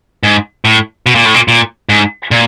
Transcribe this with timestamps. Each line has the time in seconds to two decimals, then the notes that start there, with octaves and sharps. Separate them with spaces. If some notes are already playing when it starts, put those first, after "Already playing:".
0.23 G#2
0.65 A2
1.06 B2
1.15 A#2
1.25 A2
1.34 A#2
1.48 A#2
1.89 G#2
2.31 A#2